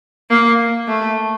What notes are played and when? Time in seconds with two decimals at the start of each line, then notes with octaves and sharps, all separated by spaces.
0.30 A#3
0.88 A3